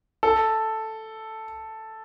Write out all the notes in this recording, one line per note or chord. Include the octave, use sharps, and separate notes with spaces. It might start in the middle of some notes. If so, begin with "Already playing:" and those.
A4